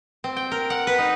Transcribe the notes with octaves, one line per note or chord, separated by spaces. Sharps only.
C4
G5
A#4
F#5
B4
D#4